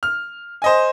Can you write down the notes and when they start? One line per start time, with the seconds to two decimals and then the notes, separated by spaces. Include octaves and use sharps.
0.03 F6
0.62 C5 D#5 G#5